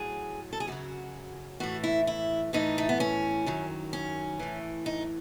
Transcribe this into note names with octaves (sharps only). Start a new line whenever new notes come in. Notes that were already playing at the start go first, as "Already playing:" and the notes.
Already playing: A2 F#3 G#4
A4
G#4
F#2 C#3 F#3 F#4
A2 E3 F#4
E4
E4
A2 E3 D#4
A3
B3
C#4
F#2 D#3 F#3
C#4
A2 E3
D#4